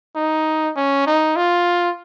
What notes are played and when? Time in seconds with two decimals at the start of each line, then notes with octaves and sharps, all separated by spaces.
0.16 D#4
0.76 C#4
1.07 D#4
1.36 F4